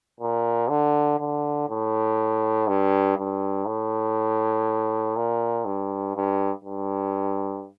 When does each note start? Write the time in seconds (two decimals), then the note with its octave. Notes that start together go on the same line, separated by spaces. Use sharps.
0.20 A#2
0.70 D3
1.20 D3
1.69 A2
2.68 G2
3.18 G2
3.67 A2
5.17 A#2
5.66 G2
6.16 G2
6.65 G2